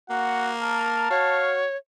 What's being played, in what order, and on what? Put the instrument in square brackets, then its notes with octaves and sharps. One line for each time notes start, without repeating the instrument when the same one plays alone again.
[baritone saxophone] A#3 [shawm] F#4 [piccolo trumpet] F#5
[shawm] A#4 [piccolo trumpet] A5
[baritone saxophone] F#4 [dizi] C#5 [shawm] F5